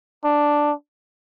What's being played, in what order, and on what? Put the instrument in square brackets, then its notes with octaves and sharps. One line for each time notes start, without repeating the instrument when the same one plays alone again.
[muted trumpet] D4